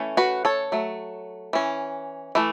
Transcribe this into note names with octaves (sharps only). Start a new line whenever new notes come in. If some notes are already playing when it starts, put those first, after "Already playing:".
Already playing: E3 A3 C#4
F#4 B4
A4 C#5
F#3 A3
E3 C#4
E3 A3